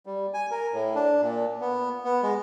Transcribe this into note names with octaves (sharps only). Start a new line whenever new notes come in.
G3
G#5
A#4
A2
D4
A#2
B3
B3
G#3